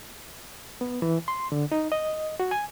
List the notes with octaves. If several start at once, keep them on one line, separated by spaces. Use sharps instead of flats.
B3
E3
C6
D3
D#4
D#5
F#4
G#5